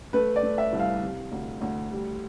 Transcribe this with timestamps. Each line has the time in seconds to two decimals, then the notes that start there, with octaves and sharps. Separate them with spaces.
0.13 A3 B4
0.36 D5
0.43 A3
0.58 E5
0.73 C2
0.80 F5
1.03 C3
1.32 D2
1.61 D2
1.92 G3